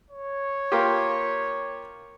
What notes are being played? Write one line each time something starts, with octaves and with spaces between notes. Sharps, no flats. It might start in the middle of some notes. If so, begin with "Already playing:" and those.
C#5
A#3 F4 G4